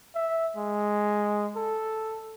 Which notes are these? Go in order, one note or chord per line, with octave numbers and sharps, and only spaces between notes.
E5
G#3
A4